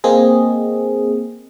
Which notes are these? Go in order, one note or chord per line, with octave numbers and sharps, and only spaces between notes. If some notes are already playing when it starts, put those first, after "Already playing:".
A#3 C4 G#4 D#5